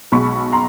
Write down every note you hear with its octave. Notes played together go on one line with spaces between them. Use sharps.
B1 B2 G#3 B5 C#6
A#5 C6